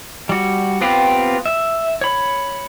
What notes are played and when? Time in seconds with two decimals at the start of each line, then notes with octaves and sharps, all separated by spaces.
0.29 G3 F#4
0.81 B3 C4 F4 G4 B4
1.46 E5
2.01 C#5 B5